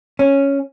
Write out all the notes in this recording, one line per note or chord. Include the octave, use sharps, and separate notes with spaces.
C#4